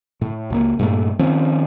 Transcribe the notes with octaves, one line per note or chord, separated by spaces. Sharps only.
A2
C#2 F3 A#3
G2 A#2 A3
D#3 F3 C4 C#4